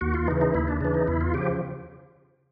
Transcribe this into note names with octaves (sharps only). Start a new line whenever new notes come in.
D#2 F#4
F4
C#3 E3 D#4
D#4
D#2 E4
D4
C#3 E3 D4
D#4
E2 E4
F4
C#3 F3 G4